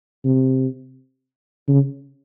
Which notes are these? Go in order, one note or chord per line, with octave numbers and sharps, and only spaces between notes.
C3
C#3